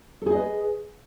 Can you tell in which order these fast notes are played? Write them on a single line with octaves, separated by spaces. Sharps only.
A4 G#4 D#5 B4